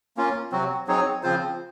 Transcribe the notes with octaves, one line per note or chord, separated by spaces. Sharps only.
A#3 C#4 F4
C3 F#3 C4 F#4
F#3 C4 D#4 G#4 C#5
C#3 F3 C4 F4 C5